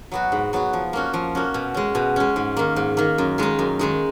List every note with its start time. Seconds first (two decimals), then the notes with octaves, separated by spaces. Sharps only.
0.12 F#3 B3 F#4
0.32 G#2
0.53 F#3 B3 F#4
0.73 F3
0.93 A#3 C#4 F#4
1.14 F3
1.35 A#3 C#4 F#4
1.54 B2
1.74 G#3 C#4
1.95 B2
2.16 G#3 C#4
2.36 G#2
2.57 D#3 A#3
2.76 G#2
2.97 D#3 A#3
3.18 F#2
3.38 D#3 G#3 D#4
3.59 F#2
3.79 D#3 G#3 D#4